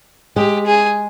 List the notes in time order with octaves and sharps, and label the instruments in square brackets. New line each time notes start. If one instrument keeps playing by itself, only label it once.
[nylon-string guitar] G#3 [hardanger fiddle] G4
[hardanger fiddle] G#4